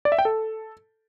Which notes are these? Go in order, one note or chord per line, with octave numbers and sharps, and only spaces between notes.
D5
E5
G5
A4